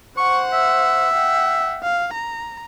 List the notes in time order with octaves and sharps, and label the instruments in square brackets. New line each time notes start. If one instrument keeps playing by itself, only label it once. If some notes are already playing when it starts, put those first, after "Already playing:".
[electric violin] C5 F#5 [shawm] C#6
[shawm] E5
[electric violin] F#5 G5
F5
A#5